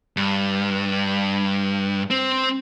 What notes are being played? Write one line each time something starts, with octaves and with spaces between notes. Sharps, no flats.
G2
C4